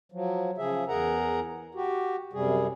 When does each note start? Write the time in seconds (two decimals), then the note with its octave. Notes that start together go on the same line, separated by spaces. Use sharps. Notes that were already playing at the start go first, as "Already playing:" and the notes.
0.12 F3 F#3
0.58 C#3 F3 G#4 E5
0.88 E2 G#4 A#4 F#5 A#5
1.75 F#4 G4
2.33 F#2 C3 G3 G#4